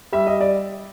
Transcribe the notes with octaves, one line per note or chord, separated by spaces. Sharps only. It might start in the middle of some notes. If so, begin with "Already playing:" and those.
G3 E5
D#5
D5